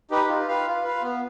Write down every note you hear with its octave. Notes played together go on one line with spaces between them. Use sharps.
D#4 G4 B4
F4
B4 F5
F4
B4 F5
B3